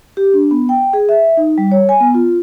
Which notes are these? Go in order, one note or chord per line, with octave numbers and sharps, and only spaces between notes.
G4
D4
B3
G5
G#4
E5
D#4
G3
C#5
G#5
B3
F4